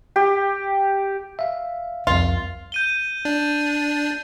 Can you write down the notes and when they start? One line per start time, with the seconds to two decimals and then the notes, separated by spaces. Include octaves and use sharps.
0.16 G4
1.39 E5 F5
2.07 C2 F2 F4
2.72 G6 D#7 G7
3.25 D4